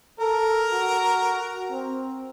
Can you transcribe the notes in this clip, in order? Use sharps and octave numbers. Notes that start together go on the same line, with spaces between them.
A4 A#4
F#4
C4